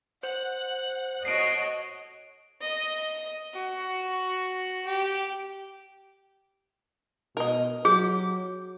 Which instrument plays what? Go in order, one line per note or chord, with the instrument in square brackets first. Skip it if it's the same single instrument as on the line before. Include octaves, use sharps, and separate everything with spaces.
[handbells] C5 [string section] F#5 F#6
[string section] F#4 A4 C#5 [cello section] D#5 [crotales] C7 D7
[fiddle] D#5
F#4
G4
[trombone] B2 [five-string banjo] A#4 D#5
[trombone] F#3 [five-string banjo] G4 [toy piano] G#4